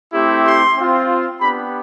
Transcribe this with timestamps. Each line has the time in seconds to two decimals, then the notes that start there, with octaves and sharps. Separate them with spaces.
0.13 A3 C4 E4 G4
0.45 C6
0.77 C4 F4
1.41 B3 D4 G4 B5